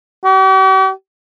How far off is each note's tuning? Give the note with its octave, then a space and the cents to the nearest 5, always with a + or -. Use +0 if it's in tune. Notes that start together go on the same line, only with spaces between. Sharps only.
G4 -45